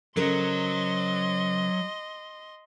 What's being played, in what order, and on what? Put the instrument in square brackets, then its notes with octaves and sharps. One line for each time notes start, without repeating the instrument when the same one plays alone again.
[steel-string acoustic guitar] C#3 A#4 C5 [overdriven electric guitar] F#3 [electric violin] D#5 C6